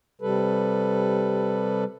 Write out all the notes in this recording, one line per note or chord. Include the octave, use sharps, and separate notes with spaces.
C3 G3 A4 B4